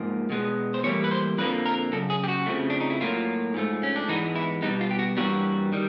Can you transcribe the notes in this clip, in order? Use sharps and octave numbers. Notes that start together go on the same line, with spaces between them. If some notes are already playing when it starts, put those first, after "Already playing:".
Already playing: G#2 F3 A#3
B2 G#3 B3
C5
A2 E3 G3 A#3 C#5
B4
C5
F2 D3 F3 A#3 B4
A#4
F#2 C#3 A4
G#4
G4
F#4
F2 C#3 F3 A3
D4
D#4
E4
A2 F#3 A#3 F4
G#2 F3 A3
C#4
D4
G#2 E3 G#3 B3 D#4
E4
B2 G3 B3 D#4
F4
G4
F#4
G2 E3 G3 A#3 F#4
D#3 G3